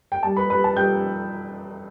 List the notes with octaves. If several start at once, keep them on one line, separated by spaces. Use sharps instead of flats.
G5
G3 A5
B4 B5
G3 B4 B5
A5
G3 G5 G6